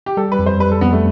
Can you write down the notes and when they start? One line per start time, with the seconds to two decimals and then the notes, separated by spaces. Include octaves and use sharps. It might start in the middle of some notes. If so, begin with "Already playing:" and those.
0.06 G4
0.17 G3 A4
0.32 B4
0.39 F2
0.46 C5
0.60 G3 B4
0.72 A4
0.81 F2 B3
0.92 A3